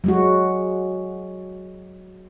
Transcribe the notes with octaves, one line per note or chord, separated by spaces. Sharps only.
F#3 G#3 F#4